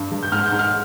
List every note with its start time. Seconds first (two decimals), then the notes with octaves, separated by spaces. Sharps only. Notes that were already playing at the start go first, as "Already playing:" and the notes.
Already playing: G2
0.11 G2
0.23 G6
0.32 G#2 F6
0.46 G6
0.52 G#2
0.59 F6